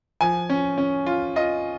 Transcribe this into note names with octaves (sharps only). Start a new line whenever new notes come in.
F3 G#5
C#4
C#4
F4
F4 D#5